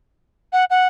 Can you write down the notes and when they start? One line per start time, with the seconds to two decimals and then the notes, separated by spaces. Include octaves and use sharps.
0.53 F#5
0.70 F#5